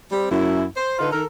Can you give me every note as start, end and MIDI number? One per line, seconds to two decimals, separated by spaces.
0.11 0.28 55
0.11 0.28 60
0.30 0.64 42
0.30 0.64 64
0.76 0.97 72
0.99 1.09 50
0.99 1.09 63
0.99 1.09 65
0.99 1.09 69
0.99 1.09 71
1.12 1.23 51
1.12 1.23 69
1.12 1.23 70